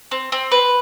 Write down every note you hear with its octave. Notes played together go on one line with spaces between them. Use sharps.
C4
C4
B4